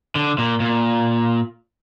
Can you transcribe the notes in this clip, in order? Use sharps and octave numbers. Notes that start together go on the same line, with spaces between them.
D3
A#2
A#2